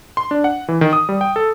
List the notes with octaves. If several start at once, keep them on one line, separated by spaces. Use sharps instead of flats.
C6
D4
F#5
E3
D#3
D#6
G3
G5
A4